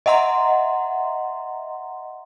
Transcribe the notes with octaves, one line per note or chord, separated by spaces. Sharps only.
D#5 E5 F#5 A#5 C6